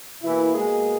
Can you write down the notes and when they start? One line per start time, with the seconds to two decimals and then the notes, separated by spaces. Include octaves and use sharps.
0.22 B2 E3 A#3 E4
0.54 G#3 G#4